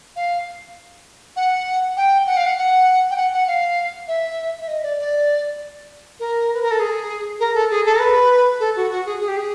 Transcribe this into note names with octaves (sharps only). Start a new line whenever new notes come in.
F5
F#5
G5
F#5
F5
F#5
F#5
G5
F#5
F#5
F5
E5
E5
D#5
D5
D5
A#4
B4
A#4
A4
G#4
A#4
A4
G#4
A4
A#4
B4
A4
F#4
F#4
G#4
G#4
G4
G#4